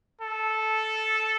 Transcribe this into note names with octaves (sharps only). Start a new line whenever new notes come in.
A4